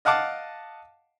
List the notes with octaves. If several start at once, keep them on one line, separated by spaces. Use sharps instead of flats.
D#5 F5 F#5 A5 D6